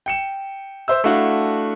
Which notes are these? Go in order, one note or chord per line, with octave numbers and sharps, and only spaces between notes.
G5 C#7 E7
C5 E5 E6
A3 D4 E4 F#4 F5 F#5